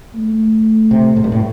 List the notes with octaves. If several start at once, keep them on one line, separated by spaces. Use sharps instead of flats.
A3
C3
A2
G2
A2